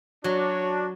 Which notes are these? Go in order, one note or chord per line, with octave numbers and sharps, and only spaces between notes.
F#3 D4 F#4 C#5